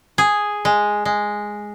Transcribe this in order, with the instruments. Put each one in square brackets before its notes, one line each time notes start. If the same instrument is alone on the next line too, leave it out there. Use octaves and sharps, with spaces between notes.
[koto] G#4
G#3
G#3